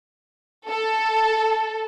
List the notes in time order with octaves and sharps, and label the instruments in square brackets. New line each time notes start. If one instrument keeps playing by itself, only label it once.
[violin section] A4